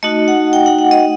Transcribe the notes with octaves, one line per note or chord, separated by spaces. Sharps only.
A3 D#4 F#4 D#5
F#5
G5
F#5
F#5
D#5